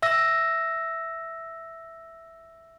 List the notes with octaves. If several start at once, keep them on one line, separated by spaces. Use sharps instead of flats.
E5 E6 A#6